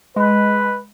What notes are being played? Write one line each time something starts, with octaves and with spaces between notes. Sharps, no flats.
G#3 B4